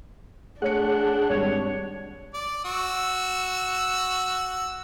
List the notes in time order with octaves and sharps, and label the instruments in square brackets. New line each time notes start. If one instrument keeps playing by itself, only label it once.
[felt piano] A3 C#5 C#7 [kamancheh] D4 [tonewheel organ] G#4 F#5 F#6
[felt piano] G#1 G3 [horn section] C#5
[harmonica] D5
F#4 E6